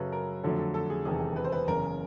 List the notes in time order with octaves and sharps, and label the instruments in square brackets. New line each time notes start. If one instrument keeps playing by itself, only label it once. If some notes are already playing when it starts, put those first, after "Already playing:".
Already playing: [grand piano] F#2 C#3 F#3 [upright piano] A4 B4
[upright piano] A#4
[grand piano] F2 D3 F#3 A3 [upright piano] A4
[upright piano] A4
A4
G#4
[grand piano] E1 E2 C3 D#3 [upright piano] G#4
[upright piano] B4
C5
B4
[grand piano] F#1 E2 C#3 [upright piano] A#4